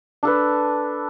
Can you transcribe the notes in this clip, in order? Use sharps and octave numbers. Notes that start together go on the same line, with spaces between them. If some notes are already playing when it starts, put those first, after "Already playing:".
D4 A4 B4